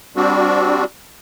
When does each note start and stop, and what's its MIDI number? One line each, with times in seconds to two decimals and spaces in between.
0.16 0.84 55
0.16 0.84 60
0.16 0.84 62
0.16 0.84 66